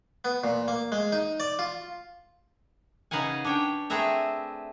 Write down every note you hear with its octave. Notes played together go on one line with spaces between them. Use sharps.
B3
A#2
A#3
G#3
D#4
D5
F4
C#3 D#4 B4 F5 F#5 G#5
D4 C#5 G5
A3 C4 G#4 B4 E5 A#5